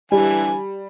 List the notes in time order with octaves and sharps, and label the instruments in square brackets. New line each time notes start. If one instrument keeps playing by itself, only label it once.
[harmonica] D3 E3 G#5 [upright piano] G3